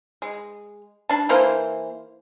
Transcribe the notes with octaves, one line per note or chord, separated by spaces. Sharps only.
G#3
D4 A5
E3 A#3 C5